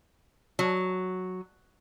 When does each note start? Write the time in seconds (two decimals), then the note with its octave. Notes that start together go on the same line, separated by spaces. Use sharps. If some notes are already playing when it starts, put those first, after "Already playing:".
0.59 F#3